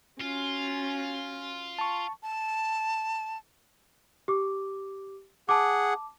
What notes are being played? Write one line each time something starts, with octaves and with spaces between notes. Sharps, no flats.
C#4 F4 F#4
A5 C#6
A5
G4 D6
G#4 F#5 A5 D6